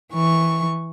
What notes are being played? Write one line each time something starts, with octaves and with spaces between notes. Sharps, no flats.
E3 C#6